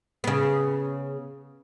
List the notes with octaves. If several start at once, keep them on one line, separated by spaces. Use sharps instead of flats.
C#3 B3